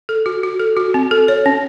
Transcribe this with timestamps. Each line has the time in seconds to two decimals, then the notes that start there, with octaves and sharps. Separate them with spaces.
0.09 A4
0.26 F#4
0.43 F#4
0.59 A4
0.77 F#4
0.94 C4
1.11 A4
1.28 C#5
1.46 C#4